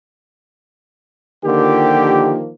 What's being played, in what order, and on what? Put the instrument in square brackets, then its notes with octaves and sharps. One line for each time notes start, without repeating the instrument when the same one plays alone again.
[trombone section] D3 G4 [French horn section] D#3 F3 A#3